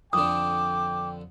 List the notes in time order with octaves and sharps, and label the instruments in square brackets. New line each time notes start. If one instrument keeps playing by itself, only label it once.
[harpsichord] F2 D3 [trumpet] G5 [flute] D6 [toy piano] D#6